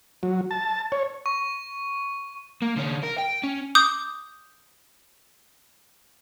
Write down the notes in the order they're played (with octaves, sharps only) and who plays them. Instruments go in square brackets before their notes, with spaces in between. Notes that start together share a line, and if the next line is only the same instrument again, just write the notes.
[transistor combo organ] F#3
A5
C#5
[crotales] C#6
[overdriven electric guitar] A#3
D3 C#4
A#4
G5
C#4
[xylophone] D6 D#6 G6